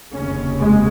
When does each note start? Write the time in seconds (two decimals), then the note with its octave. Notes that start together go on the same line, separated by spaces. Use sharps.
0.14 F1 D#2 C#3 C#4
0.60 G#3